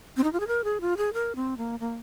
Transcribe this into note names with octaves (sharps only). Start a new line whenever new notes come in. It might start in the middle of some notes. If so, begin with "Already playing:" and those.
C4
D#4
F4
G#4
A#4
G#4
F4
G#4
A#4
C4
A#3
A#3